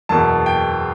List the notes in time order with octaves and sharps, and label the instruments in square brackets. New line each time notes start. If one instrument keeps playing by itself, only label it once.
[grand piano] F#1 E2 B2 A5
G5